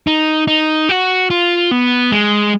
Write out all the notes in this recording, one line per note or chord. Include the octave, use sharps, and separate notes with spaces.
D#4
D#4
F#4
F4
B3
G#3